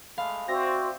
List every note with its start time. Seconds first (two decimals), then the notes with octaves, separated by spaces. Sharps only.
0.18 G#3 A3 F5 B5
0.48 C4 F#4 C5 D5 E5 A#6